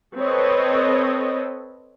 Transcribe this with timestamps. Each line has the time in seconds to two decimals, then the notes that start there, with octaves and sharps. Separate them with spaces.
0.18 C4 A4 B4 C#5 D#5